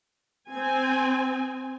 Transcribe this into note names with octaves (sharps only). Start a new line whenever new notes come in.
C4 G#5